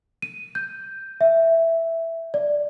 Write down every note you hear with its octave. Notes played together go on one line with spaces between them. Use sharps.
D#7
G6
E5
D5